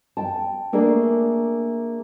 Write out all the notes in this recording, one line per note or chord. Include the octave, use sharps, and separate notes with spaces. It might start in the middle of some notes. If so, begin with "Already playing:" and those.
G5 A5
A3 A#3 D4 G#4